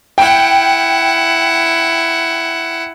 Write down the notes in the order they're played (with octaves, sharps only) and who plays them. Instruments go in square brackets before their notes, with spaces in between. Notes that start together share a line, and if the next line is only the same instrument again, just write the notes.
[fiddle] E4 F#5 [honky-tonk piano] G5